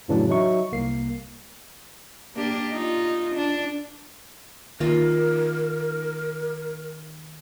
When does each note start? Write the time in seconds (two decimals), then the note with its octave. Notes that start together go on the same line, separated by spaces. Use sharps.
0.08 F2 A2 C#3 E3 F#3 D4
0.29 F#3 D#4 E5 C#6
0.72 C2 A#3 C7
2.35 A#3 D4 G4
2.71 D#4 F4
3.35 D4
4.80 D#3 A#3 F4 A#4